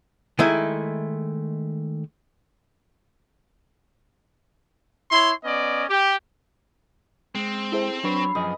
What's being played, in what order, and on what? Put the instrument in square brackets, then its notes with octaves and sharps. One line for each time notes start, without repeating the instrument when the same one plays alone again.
[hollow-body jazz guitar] D#3 G#3 A3 E4
[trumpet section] E4 C#5 C6
B3 C#4 D5 D#5
G4
[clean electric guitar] G#3 [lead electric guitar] C4
[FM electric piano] E4 G#4 C5 [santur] A4 G5
[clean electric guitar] F#3 C#5 [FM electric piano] D4 C7 [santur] B4
[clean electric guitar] F#2 F3 G#4 [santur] D#5